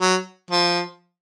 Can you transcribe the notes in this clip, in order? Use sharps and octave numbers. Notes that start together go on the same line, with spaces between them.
F#3
F3